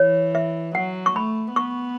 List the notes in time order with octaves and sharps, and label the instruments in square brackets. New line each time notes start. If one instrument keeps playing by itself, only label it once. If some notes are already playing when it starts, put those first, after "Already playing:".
Already playing: [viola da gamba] E3 [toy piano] C#5
[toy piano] E5
[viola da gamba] F#3 [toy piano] F#5
[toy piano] C#6
[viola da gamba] A3 [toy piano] B5
[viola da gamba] B3 [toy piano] C#6